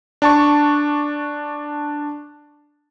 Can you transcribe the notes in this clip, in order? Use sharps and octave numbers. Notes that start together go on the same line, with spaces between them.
D4 A5 C#6